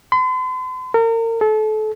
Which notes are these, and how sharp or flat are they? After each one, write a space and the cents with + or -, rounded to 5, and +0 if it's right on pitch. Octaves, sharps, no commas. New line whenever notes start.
C6 -45
A#4 -35
A4 -30